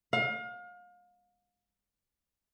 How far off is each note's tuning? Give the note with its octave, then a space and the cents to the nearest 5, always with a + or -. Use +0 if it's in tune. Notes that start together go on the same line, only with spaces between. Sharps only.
F5 +35